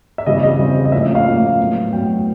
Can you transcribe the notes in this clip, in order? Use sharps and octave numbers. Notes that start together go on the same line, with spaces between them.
E5
C#3 E3 G3 C4 D#5
D#5
C#3 E3 G3 C4
D#5
A2 F3 A#3 C#4 E5
F5
A2 F3 A#3 C#4
A2 F#3 B3
A2 F#3 B3 G5